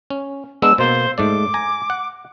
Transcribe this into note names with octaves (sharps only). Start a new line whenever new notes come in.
C#4
G#3 B3 D4 E6
B2 A#3 C5
G#2 A3 D5 D6
G#5 A#5
F#5